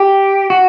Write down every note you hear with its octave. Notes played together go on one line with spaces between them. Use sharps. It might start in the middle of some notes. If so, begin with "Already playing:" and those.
Already playing: G4
F#4